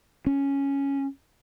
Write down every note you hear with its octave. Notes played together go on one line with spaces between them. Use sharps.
C#4